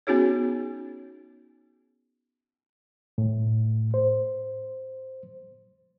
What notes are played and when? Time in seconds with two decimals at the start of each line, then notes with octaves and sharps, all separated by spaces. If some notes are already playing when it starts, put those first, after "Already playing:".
0.07 B3 C#4 D#4 F#4 G#4 C#5
3.18 A2
3.94 C5